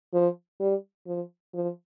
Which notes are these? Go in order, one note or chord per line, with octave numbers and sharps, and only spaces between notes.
F3
G3
F3
F3